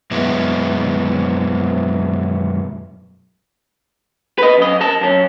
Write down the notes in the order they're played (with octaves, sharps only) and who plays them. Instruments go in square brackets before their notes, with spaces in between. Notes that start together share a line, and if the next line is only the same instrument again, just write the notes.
[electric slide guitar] F#2 B2 G#3 B3 E4
[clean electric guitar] B4 D#5
F#2 D#5
A#4 A5
F#2 C#4